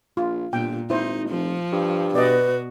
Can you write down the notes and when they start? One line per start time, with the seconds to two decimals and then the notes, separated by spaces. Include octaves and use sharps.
0.17 A#1 F4
0.53 G1 A#2 G5
0.90 G#1 D#4 E4 C5
1.29 F1 F3
1.72 G2
2.15 B2 B3 F#4 B4 D5 D#5